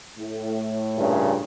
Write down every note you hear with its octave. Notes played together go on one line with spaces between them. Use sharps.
A2
G2 A#2 C#3